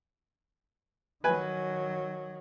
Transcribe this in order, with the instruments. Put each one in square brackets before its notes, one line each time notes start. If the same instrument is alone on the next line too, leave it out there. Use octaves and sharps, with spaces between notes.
[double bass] D#3 F#3 [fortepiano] B4 G#5